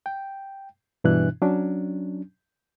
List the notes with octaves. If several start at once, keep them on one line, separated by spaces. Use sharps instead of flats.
G5
G2 B2 E3 D4 E4 F#6
F#3 C#4 D4